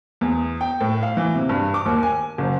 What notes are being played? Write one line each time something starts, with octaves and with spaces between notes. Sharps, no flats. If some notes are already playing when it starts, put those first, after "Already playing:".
E2
G5
A2
F5
E3
C3
G2
D6
D#2
G#5
F#1